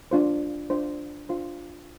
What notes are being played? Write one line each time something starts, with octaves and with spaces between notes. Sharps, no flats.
D4 F4 C5
D4 F4 C5
D4 F4 C5